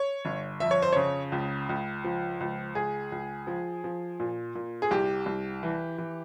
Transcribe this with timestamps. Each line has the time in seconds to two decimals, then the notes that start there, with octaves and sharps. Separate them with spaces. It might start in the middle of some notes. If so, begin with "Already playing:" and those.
Already playing: C#5
0.25 G1
0.60 F2 E5
0.71 C#5
0.82 C5
0.93 C#3 C#5
1.32 C#2
1.69 C#2
2.04 F3
2.40 C#2
2.75 C#2 G#4
3.12 C#2
3.47 F3
3.84 F3
4.20 A#2
4.55 A#2
4.82 G#4
4.91 C2 G4
5.26 C2
5.63 E3
5.98 E3